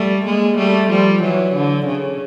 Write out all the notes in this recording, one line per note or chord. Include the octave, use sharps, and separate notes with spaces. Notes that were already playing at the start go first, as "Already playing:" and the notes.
Already playing: G3 A3
G#3 A#3
G3 A3
F3 G3
E3 F#3
D3
C#3